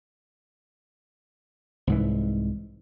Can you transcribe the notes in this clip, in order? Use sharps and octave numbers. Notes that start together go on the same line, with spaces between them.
C2 G#2 E3